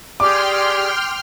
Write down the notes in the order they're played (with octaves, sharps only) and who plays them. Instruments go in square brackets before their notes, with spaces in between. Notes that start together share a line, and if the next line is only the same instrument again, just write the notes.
[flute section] G4 G#4 [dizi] D5 [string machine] G5 C6 F6 [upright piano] D6